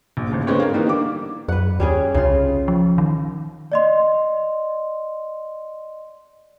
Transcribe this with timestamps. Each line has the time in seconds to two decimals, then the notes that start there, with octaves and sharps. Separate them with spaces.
0.17 A#1
0.29 A1 D#2 C#3
0.47 D3 G#3 C4 B4 C#5
0.60 A#4 F5
0.73 D#3 E3 G3 A#3 B3 D#4
0.87 D3 D6
1.48 F#2 B4 F#5
1.80 D#2 G3 C#4 G#4
2.14 C2 C#3 F4
2.68 F3
2.98 D#3
3.72 D5 D#5 C6